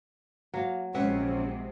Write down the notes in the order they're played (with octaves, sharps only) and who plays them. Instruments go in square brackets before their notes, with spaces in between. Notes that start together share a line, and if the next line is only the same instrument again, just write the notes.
[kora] F#3 [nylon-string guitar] A#3 F5
[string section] A#1 C3 [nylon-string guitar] G#3 B4 F#5 [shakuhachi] C#4 [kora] E5